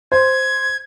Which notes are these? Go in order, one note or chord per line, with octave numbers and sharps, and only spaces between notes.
C5 G#6